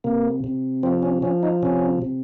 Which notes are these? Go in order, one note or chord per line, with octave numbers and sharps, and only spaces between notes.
C3 A#3
C3
F3 C4
C#4
F3 C#4
D#4
C3 C#4
C3